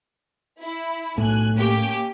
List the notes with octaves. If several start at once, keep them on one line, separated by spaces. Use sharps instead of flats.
E4
B1 A2 G#5 F#6
A#3 C#4 G4